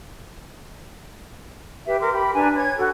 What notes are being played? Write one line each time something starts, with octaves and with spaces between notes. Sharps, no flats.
G4 B4 E5
A#4 C6 D6
G4 B5
D4 B4 G#5 A#5
C#5 G#6
F#4 A4